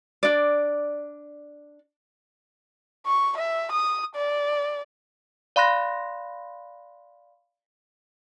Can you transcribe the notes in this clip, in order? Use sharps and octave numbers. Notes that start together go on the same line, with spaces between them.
D4 D5
C#6
E5
D#6
D5
D5 F5 B5 C6 F#6 A#6